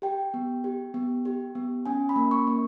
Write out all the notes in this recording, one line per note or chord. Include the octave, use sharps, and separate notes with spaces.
G4 G5
B3
G4
B3
G4
B3
C#4 G#5
B5
A#3
C#6
A#3